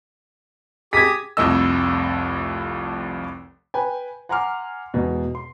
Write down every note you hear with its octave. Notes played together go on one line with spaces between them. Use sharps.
G4 G#4 D#6 G#6 A#6 B6
F1 C2 F2 A3 D#5 E6
B4 G5 G#5
F#5 G#5 A#5 C6 D6 F6
E2 G#2 B2
C6